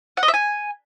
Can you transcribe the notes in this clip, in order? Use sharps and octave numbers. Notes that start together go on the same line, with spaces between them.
F#5
D#5
E5
G#5